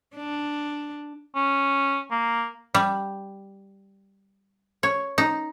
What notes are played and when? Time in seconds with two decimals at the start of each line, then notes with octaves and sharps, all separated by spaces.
0.16 D4
1.35 C#4
2.11 A#3
2.75 G3
4.83 C#5
5.18 D#4